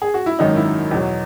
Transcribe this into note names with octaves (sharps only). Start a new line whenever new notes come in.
G#4
F#4
E4
G#1 F#2 D#3 F#3 D#4
E4
E2 B2 F#3